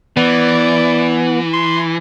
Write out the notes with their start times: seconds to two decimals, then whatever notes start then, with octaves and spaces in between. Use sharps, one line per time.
0.17 E3 B3 D5
1.53 C6